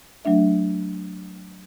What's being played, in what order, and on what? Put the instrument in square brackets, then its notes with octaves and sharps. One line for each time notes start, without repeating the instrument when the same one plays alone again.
[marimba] F#3 A3 D4 E5